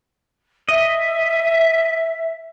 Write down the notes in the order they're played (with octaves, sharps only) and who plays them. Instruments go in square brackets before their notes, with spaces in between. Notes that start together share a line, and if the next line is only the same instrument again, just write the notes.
[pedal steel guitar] D#5 [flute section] E5